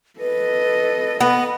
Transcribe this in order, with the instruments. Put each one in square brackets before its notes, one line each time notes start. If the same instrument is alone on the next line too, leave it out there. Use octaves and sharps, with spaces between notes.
[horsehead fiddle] A4 D#5 [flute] B4
[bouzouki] B3 [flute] B5